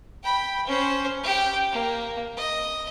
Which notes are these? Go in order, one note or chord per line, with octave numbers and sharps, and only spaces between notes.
G5 B5
C#4 C5
G4 G5
A#3
D#5